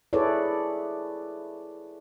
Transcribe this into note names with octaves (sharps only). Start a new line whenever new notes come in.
E4 G#4 A4 B4 C#5 D5